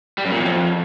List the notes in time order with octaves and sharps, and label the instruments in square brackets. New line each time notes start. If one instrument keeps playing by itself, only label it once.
[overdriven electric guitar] G3
F#2
A#2
E2
F2